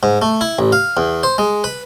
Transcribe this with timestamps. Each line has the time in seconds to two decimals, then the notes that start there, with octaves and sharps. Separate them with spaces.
0.03 G#2
0.22 A3
0.41 E4
0.59 A1
0.72 F5
0.97 E2
1.23 C5
1.38 G#3
1.64 B4